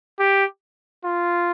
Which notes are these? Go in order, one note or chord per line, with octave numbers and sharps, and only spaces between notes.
G4
F4